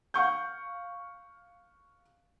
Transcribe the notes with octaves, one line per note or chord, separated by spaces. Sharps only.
F5 F#5 C#6 G6